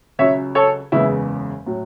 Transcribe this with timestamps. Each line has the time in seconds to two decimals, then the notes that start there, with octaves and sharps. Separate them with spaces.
0.19 C#2 C#3 F#3 C#5 E5
0.55 A4 C#5
0.92 F#1 E2 C#3 E3 G#3 E4
1.66 A2 F#3